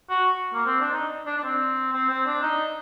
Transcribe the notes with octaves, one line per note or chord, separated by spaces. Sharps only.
F#4
A#3
C4
D4
D#4
D4
D4
C4
C4
C4
D4
D#4